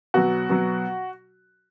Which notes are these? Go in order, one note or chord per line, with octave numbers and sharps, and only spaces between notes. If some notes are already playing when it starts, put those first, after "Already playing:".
B2 F#3 F#4
B2 F#3